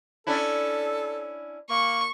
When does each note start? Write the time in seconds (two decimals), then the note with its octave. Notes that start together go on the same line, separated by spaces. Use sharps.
0.27 C#4 D4 E4 A4
1.70 A#3 C#6